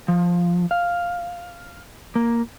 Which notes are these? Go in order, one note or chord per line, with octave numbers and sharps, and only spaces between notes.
F3
F5
A#3